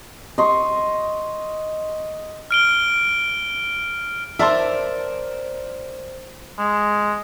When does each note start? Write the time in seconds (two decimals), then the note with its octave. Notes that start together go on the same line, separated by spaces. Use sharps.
0.38 D#5 C6 C#6
2.51 F6 D7 G7
4.39 A#4 C5 D5 E5 A5 C6
6.58 G#3